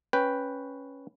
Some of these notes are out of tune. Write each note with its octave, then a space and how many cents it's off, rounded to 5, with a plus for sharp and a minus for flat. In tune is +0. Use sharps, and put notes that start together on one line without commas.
C#4 +0 B4 +0 G5 +0